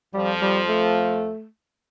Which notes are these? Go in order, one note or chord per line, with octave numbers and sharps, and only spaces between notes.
F2 F3 G3
G3
A3